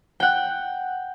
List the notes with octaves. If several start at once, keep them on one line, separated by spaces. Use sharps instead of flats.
F#5 G5